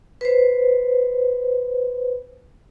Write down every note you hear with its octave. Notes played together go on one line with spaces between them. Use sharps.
B4 C5